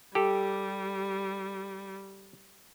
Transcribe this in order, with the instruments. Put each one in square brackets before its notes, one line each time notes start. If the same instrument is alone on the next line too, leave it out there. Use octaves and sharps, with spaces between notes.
[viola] G3 [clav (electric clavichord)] G4 A4